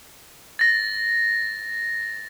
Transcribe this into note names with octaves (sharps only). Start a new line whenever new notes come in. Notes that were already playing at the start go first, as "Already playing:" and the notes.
A6 A#6